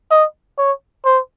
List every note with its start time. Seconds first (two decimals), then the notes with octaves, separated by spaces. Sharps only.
0.11 D#5
0.58 C#5
1.05 C5